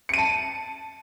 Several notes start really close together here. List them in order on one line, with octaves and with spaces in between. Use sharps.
C#7 D#7 A5